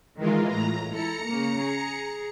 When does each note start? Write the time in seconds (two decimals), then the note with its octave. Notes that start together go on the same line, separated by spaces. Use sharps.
0.18 D#3 E3 G#3 F4 A#4
0.49 A2 A#5
0.92 E4 A4 A#5 C#7
1.26 C#3 A#3
1.61 G#4